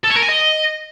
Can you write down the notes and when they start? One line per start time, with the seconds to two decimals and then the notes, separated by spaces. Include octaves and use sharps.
0.04 A4
0.10 C#5
0.16 A#4
0.22 G#5
0.28 D#5